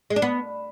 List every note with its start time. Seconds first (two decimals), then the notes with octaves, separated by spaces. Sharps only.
0.10 G#3
0.16 D4
0.22 B3